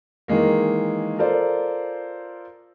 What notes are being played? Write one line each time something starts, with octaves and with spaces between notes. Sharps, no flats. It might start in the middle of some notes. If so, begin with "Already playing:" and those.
D#3 E3 G#3 A#3
F4 A4 A#4 C5 D5